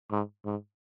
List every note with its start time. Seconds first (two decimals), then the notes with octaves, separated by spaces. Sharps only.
0.11 G#2
0.45 G#2